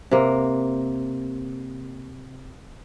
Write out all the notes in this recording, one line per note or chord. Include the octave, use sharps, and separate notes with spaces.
C3 A#3